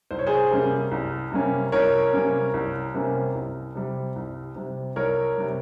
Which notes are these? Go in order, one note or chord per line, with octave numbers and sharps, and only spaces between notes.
C2 C5
C#5
G#4 C5
C3 G3 A#3 C#4
C2
C3 G3 A#3 C#4
C2 A#4 C#5
C3 G3 A#3 C#4
C2
C3 G3 A#3 C#4
C2
C3 G3
C2
C3 G3
C2 A#4 C#5
C3 G3